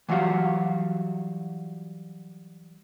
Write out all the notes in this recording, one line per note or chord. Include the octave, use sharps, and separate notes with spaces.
E3 F#3 G3 F#4 F5